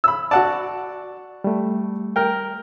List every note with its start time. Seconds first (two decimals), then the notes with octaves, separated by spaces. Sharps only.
0.04 B5 E6
0.31 F#4 D5 F#5 A5
1.44 G3 A3
2.16 A#4 G5